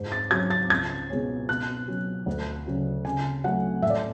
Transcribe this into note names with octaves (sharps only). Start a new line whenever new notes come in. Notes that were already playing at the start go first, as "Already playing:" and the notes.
Already playing: G#2
A6
F#3 C#4 G#6
A6
C#2 G#6
B2 G#3 C#4
B2 F#6
F#3 C#4
D2
C#3 F#3 C#4
C#3 G#5
F#3 A3 F#5
A2 E5
D5